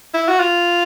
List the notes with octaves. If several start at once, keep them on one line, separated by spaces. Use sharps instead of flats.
E4
F#4
F4